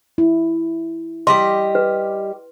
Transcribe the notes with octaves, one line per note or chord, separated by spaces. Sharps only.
E4
G3 G4 D#5 C6
B4